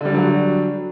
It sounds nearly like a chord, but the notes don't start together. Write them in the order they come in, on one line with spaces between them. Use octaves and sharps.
D3 G3 D4 F#3 F#4